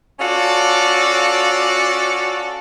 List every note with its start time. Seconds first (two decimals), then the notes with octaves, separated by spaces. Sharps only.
0.20 C#4 F4 F#4 A4 D5